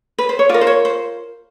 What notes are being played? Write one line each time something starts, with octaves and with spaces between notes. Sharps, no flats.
B4
C5
C#5
F4 A#4 D5
C5
C#5
C5